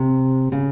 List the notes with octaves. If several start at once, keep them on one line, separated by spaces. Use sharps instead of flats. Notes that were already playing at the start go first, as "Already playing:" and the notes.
Already playing: C3
C#3